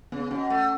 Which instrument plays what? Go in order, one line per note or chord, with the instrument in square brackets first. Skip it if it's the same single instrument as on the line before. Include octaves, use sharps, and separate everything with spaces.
[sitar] C#3 [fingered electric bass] B3
[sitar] B2 [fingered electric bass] C#4
[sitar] A3